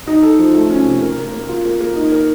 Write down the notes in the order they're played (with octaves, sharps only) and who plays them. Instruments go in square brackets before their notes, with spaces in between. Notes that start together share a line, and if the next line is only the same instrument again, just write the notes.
[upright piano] D#4
A4
F3
A3
C#4
C3
A#4
A#3
A#3
F4
A#3
A#3
D#4
A#4